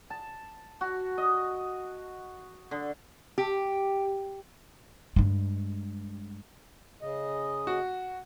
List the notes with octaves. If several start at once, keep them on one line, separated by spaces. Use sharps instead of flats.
A5
F#4
D#5
D3
G4
G2 G#3
C#3 D#5
F#4